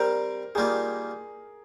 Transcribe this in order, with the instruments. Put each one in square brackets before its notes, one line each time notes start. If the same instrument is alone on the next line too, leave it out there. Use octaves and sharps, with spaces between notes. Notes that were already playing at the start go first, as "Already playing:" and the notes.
Already playing: [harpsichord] G3 C4 G4 [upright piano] A#4
[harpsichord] D#3 G3 A#3 F4 [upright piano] G#4